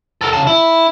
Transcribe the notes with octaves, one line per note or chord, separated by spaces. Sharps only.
A4 A#4
C#3 A5
E4